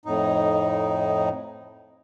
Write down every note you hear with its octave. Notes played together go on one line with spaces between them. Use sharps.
F2 A2 D#4